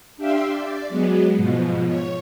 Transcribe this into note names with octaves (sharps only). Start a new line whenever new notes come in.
D4 G4 E5 F5 G5 C6
D5
F#3 G#3 B3
G#2 B2 F3
C#5